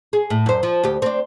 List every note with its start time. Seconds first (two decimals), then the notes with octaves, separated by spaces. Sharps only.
0.13 G#4
0.30 A2
0.46 F#2 C5
0.63 F3
0.83 D2 G4
1.02 C4 D4